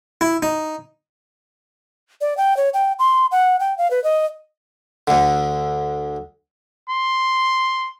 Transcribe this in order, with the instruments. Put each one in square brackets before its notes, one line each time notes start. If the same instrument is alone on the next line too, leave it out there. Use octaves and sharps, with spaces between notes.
[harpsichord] E4
D#4
[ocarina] D5
G5
C#5
G5
C6
F#5
G5
F5
B4
D#5
[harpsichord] D2 D3
[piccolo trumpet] C6